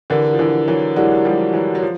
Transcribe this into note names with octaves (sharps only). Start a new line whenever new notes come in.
D3 E3 E4 G4 A#4 D5 F#5
F3
D3 E3
E3 F#3
F#3 G#3 E4 G4 A#4 D5 F#5
F3 G3
E3 F#3
F#3
F3